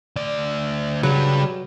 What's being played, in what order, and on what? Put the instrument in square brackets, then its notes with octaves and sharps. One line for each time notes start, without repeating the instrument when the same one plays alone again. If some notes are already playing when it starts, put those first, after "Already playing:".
[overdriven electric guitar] D2 D5
[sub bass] C#3 [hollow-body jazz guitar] F#3 [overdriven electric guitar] G3 B4